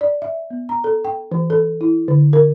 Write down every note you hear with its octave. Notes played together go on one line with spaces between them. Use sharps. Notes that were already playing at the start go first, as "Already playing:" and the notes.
D5
E5
B3
A#5
A4
G5
E3
A4
E4
D3
A#4